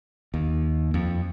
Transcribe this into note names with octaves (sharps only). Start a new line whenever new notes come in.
D#2
F2